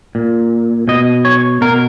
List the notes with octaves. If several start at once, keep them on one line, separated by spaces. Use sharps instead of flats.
A#2
B2 D#5
C#5
B2 A#4